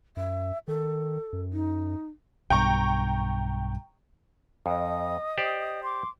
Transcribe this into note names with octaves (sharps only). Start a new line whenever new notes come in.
F#2 E5
D#3 A4
F#2
D#4
B1 G2 G5 A#5 C#6
F2 D#5 D#6
G4 C5 D5
C6 D6